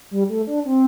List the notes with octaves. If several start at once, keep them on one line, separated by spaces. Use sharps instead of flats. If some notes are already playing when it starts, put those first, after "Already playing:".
G3
A3
D4
C4